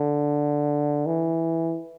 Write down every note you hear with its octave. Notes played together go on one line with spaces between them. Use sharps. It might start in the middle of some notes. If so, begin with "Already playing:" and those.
Already playing: D3
E3